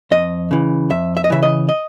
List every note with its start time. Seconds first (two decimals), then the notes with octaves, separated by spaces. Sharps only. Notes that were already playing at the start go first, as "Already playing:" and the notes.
0.11 F2 D#5
0.51 C#3 E3
0.90 F2 E5
1.17 E5
1.24 D#5
1.30 C#3 E3 E5
1.43 D#5
1.69 D#5